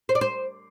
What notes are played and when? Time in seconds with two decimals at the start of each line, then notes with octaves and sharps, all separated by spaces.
0.09 C5
0.15 D5
0.21 C5